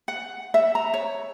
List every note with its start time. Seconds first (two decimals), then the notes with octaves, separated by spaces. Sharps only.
0.08 F#5
0.54 E5
0.75 A#5
0.94 C#5